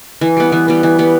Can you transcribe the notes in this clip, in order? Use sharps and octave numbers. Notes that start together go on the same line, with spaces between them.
E3
G3 B3
E3
G3 B3
E3
G3 B3